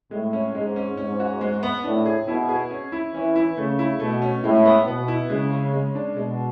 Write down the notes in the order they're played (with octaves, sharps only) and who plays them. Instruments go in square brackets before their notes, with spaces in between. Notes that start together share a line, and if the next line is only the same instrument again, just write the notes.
[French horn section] A2 [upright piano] G#3
[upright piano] C#4
[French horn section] G#2 [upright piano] G#3
[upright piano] C#4
[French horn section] G#2 [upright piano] C#4
[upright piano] F#4
G#3
B3
[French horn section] A2 [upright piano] D4
[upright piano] G#4
[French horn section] B2 [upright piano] E4
[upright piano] G#4
C#4
E4
[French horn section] E3 [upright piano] C#4
[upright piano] E4
[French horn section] C#3 [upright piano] A3
[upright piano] E4
[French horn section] B2 [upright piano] A3
[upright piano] C#4
[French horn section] A2 [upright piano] G#3
[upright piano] B3
[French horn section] B2 [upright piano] B3
[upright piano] E4
[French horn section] C#3 [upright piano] G#3
[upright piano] C#4
G#3
D4
[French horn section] B2 [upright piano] G#3